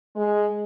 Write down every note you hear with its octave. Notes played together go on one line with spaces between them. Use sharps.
G#3